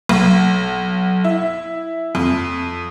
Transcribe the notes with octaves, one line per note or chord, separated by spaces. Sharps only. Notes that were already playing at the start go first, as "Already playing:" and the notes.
B1
E4
F2